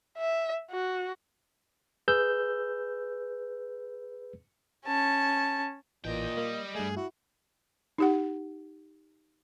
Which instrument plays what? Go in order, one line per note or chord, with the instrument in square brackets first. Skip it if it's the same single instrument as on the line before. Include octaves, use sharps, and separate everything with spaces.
[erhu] E5
F#4
[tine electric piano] G#4 B4 E6 G6
[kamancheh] C#4 A5
[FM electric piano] A1 E3 G6 [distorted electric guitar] D#2 G5 [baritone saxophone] A#2 [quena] D#5
[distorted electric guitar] G3 [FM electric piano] A#3
[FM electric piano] G2 A3 [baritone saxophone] G#4
[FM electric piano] E4 [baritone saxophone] F#4
[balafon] D#4 G4 F#5